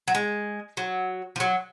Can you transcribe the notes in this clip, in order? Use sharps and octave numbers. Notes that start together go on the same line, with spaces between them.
F#3
G#3
F#3
F3
F#3